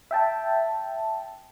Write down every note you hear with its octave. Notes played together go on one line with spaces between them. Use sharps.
E5 G5 A5